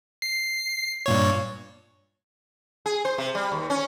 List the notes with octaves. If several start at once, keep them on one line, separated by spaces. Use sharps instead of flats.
C7
G2 A#2 C#5
G#4
C5
C3
G3
D#2
C#4